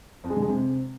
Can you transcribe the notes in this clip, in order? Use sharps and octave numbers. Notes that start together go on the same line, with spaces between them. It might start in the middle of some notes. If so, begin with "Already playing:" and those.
F2
G#3
D3
G#3
C3